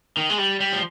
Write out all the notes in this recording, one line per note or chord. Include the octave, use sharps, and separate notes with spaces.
D#3
G#3
G3
G3
F3